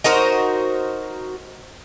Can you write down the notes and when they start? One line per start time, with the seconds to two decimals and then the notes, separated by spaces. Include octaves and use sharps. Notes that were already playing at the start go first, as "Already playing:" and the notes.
0.04 D#4 F#4 A#4 C5